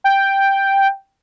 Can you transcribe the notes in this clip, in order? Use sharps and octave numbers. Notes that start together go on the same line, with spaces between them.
G5